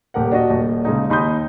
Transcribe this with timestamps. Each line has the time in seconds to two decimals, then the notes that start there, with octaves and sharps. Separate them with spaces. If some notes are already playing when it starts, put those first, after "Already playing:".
0.14 D#1 G4 A#4 F#5
0.32 D4 F#4 D#5
0.50 D#1
0.85 C#3 G#3 D#4
1.10 D#2 D#4 B5 C6 D#6 G6